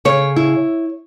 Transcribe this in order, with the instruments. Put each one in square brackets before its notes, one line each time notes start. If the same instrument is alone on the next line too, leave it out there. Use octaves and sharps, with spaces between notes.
[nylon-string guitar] C#3 C#5
E4